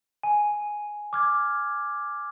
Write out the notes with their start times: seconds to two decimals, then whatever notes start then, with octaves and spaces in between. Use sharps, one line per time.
0.23 G#5
1.13 D6 F6 G#6